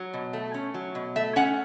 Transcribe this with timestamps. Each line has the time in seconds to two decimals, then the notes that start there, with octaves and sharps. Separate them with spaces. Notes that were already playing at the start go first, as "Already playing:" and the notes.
Already playing: F#3
0.14 B2
0.33 A3
0.54 C#4
0.74 F#3
0.95 B2
1.16 A3 E5
1.36 C#4 F#5